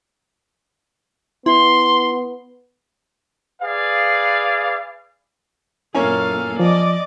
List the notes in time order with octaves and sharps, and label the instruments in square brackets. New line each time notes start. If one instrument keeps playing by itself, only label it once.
[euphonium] B3 [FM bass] E4 [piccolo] C6
[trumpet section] G#4 B4 D5 F5
[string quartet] F#2 A#2 [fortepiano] A#3 C#4 G#5 [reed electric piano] E4 [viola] A4 F5
[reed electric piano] F3 [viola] D5 D6 [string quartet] D#5